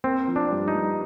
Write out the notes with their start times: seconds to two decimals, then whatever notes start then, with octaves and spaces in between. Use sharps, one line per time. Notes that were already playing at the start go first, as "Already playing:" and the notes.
0.04 A#3 C4
0.28 F3
0.36 D4
0.51 G2
0.68 D#4
0.75 G2